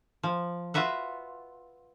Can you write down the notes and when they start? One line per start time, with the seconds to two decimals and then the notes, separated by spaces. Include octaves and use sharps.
0.23 F3
0.74 F4 F#4 B4 E5 F#5